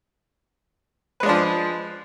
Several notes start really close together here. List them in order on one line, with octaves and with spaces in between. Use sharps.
B4 G#3 D4 F3